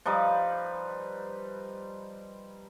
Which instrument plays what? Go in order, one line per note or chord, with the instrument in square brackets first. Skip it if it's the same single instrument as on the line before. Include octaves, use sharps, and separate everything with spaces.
[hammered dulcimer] F3 G3 D#4 B4